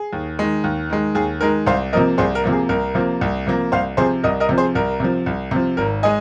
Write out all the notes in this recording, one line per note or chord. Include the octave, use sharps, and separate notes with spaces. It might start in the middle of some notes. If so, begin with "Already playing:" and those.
Already playing: G#4
D#2
D#3 G#3
D#2
D#3 G#3
D#2 G#4
D#3 G#3 A#4
C2 C5 F5
C3 F3 A#3 A#4 D#5
C2 G#4 C5
A#4
C3 F3 A#3
G#4
C2 A#4
C3 F3 A#3
C2
C3 F3 A#3
C2 C5 F5
C3 F3 G#4 C5
C2 A#4 D#5
A#4 D#5
C3 F3
G#4 C5
C2 A#4
C3 F3
C2
C3 F3
G#1 A#4
G#3 D#5 G#5